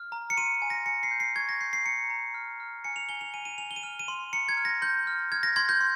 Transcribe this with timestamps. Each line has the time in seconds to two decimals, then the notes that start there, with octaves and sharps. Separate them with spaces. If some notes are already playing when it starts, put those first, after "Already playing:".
Already playing: F6
0.12 A#5
0.30 C#7
0.37 C6 D#7
0.62 G#5
0.70 A#6
0.86 G#5 C#7
1.03 C7
1.11 G6
1.20 C7
1.36 C#6 G#6
1.49 A#6
1.61 G6 C7
1.73 C7
1.85 A#5 C#7
2.10 A#5
2.34 F6
2.60 F6
2.84 G#5 C#7
2.96 F7
3.09 G#5 G7
3.21 F7
3.34 G#5 D#7
3.45 D#7
3.58 G#5 F7
3.71 G7
3.76 D#7
3.83 F6 F7
3.99 D#7
4.08 C6
4.33 A#5 C#7
4.49 G#6
4.57 F6
4.65 A#6
4.82 C6 G6
5.07 F6
5.32 F6 G#6
5.43 A#6
5.56 C6 G#6
5.69 G6
5.81 C6